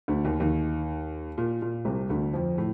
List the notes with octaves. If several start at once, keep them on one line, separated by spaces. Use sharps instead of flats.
D2 D3
D#2 D#3
D#2 D#3
A#2
A#2
C2 C3
D2 D3
F2 F3
A2